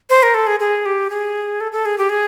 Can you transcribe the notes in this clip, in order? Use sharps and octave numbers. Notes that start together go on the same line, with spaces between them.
C5
A#4
A4
G#4
G#4
G4
G#4
A4
A4
G#4
G4
G#4